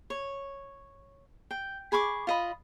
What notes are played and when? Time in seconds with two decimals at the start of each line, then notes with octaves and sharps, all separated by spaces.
0.10 C#5
1.51 G5
1.92 G#4 B5 C#6 D6
2.27 F4 D#5 B5